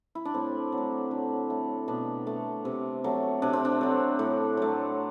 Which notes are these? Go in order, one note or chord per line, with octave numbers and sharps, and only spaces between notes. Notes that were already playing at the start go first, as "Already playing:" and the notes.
E4
D4
A2 C4
F#3
A3
D3
A3
B2 D4
A3
C3
F#3 A3
C3 D4
C4
D4
F#3 A3
A2
F#3 A3